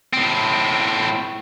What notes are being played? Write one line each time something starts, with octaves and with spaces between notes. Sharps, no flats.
A2 C4